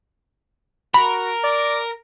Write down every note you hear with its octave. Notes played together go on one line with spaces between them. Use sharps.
F#4 A#4 B5
D5